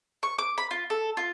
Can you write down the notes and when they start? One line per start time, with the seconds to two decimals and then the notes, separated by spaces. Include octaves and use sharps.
0.23 C#6
0.39 D6
0.58 B5
0.71 F4
0.90 A4
1.17 F4